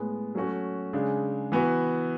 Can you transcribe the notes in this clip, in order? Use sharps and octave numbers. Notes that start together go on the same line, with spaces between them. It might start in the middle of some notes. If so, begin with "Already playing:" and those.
Already playing: A2 G#3 B3
F#3 A3 C#4 F#4
C#3 G#3 D4
E3 B3 F#4